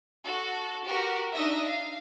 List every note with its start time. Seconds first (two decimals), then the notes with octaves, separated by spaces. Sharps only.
0.24 F#4 A4
0.85 F#4 G4 A#4
1.32 D4 D#4 D#5 E5 A#6
1.66 F5